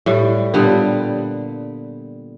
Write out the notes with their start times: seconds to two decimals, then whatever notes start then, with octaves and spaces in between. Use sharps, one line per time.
0.06 A2 G3
0.54 A#2 D3 G3 B3